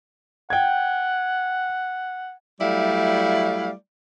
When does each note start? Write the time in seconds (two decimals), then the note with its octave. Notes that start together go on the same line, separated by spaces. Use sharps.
0.50 F#5 G5 G#6
2.61 F#3 G3 A3 E4 D5 F5